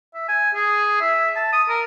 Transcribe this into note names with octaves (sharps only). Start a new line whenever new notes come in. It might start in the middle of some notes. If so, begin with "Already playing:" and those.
E5
G#5
G#4
E5
A5
D#6
A#4